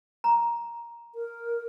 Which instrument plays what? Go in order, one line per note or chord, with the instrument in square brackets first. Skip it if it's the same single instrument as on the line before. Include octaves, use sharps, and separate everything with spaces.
[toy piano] A#5
[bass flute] A#4